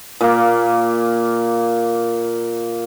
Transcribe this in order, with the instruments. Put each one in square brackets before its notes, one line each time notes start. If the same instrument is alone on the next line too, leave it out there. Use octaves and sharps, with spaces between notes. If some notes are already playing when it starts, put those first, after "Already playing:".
[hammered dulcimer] A#2 A#3